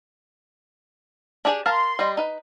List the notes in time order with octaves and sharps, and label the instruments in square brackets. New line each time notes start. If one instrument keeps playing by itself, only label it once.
[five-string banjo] D4 G4 G#4
[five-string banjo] A#4 F5 A5 [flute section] C6
[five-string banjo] G3 D#5
D#4 B4